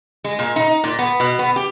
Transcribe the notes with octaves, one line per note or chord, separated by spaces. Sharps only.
G#3
A#2
D#4
A#2
B3
B2
B3
G4